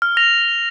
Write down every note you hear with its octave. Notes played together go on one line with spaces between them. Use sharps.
F6
A#6 F7